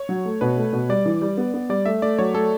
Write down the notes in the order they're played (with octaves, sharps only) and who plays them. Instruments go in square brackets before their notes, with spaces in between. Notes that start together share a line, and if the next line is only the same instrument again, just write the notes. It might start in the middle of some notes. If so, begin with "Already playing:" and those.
Already playing: [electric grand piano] C#5
[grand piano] F#3
A3
[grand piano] B2 [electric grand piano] B4
[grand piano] A3
B2
[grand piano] G3 [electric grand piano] D5
[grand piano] E3
G3
B3
B3
[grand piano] G3 [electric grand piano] D5
[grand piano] A3 [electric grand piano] E5
[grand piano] A3 [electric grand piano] D5
[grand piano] F#3 [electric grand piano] C#5
[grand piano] A3 [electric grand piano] A4